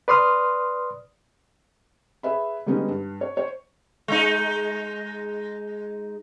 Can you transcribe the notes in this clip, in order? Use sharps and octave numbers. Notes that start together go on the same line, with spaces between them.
B4 D5 C6 D#6 F6
G#4 B4 E5 B5
D3 G3 G#3 B3 C#4 D#4
G2
C#5
C5 C#5
G#3 D#4